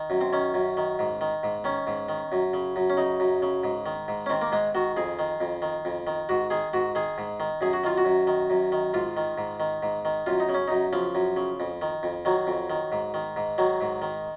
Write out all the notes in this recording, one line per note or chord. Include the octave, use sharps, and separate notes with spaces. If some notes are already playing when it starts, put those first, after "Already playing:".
Already playing: D#3
F#2
C4
D#3 C#4
F#2
D#3
G#2
D#3
G#2
D#3 C#4
G#2
D#3
F#2
C#3
F#2
C#4
C#3 D#4
F#2
C#3
G#2
D#3
G#2
C#4
D#3 C4
A#3
G#2 G#3
D#3 F#4
F2 G#4
D#3
F2
D#3
F2
D#3
G#2 F#4
D#3 G#4
G#2 F#4
D#3 G#4
G#2
D#3
F#2 G#4
F#4
D#3 F4
F#4
F#2
D#3
F#2
D#3
G#2 F4
D#3
G#2
D#3
G#2
D#3
F#2 F4
D#4
C#3
C#4
F#2 D#4
C#3 F3
F#2
C#3
F2
D#3
F2
D#3 F#3
F2
D#3
G#2
D#3
G#2
D#3 F#3
G#2
D#3